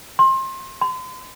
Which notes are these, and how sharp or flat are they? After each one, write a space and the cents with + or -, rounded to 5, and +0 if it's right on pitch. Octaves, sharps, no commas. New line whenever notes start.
C6 +25
C6 -40